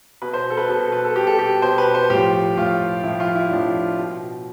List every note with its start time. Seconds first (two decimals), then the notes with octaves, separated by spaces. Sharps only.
0.22 B2 B4
0.33 C5
0.50 A4
0.57 B4
0.68 B2 A4
0.80 A4
0.92 B4
1.05 A4
1.16 B2 G4
1.27 A4
1.39 G4
1.62 B2 C5
1.78 B4
1.94 C5
2.10 A2 F3 G4
2.57 A2 F3 F4
3.03 A2 F3 E4
3.20 F4
3.35 E4
3.51 A2 F3 D4
3.99 B2